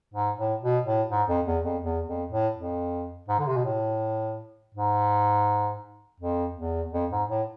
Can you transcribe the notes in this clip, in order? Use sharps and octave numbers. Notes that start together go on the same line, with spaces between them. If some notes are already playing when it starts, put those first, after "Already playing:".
G#2
A2
B2
A2
G#2
F2
E2
F2
E2
F2
A2
F2
G#2
D3
C3
B2
A2
G#2
F2
E2
F2
G#2
A2